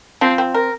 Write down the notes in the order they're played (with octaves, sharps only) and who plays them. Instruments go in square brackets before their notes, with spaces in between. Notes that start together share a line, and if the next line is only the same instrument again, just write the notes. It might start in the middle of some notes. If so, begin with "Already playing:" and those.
[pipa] F3 [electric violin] C4
[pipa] C4
A#4